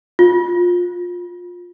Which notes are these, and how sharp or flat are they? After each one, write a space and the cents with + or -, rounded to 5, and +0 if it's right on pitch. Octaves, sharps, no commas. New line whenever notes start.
F4 +20